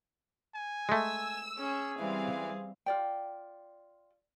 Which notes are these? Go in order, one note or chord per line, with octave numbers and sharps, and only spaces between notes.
G#5
G#3 A3 E6
C#4 G#4
E3 G3 C4 F5
F4 D5 G5